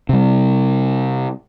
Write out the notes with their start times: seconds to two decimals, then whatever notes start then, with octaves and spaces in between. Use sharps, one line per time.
0.09 C3 G3